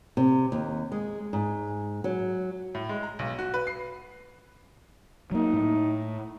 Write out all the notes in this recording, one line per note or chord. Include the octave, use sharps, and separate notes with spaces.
C3
D#2
G#3
G#2
F#3
A2
G#3
A#5
B1
F#4
B4
C7
F#3 A#3 D#4
A2